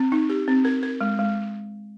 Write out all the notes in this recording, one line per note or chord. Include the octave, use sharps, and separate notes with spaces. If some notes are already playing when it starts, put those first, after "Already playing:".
Already playing: C4
D#4
G4
C4
A#4
A#4
G#3
G#3